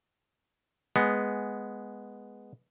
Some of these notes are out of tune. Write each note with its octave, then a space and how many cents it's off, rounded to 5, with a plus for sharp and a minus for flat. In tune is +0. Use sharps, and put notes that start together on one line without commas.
G#3 +0 B3 +0